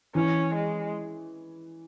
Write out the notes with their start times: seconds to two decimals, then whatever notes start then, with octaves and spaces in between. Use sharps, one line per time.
0.15 E3 C#4
0.54 G#3